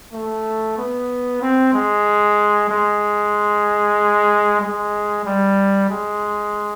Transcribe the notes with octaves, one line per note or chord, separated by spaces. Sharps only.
A3
B3
C4
G#3
G#3
G#3
G3
G#3